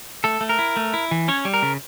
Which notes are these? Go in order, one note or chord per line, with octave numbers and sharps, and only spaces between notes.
A3 A4
A3
A#4
E4
A3
E4
E3
C#4 C#5
G3
A#4
C#3